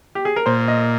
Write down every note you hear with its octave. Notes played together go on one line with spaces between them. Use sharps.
G4
G#4
A#4
A#2 C5
D#5